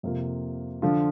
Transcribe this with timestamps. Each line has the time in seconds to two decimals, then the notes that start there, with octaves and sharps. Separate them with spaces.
0.03 F2 C3 A#3 F4
0.82 D3 F3 D4 F4